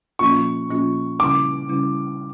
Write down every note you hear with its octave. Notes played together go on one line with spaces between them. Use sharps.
A#2 F3 A#3 C#4 F4 C#6
A#2 F3 A#3 C#4 F4
C#3 G3 C#4 E4 D6
C#3 G3 C#4 E4